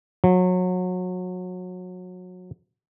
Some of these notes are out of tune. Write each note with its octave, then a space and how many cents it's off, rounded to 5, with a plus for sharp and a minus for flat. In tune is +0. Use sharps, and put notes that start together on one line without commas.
F#3 -25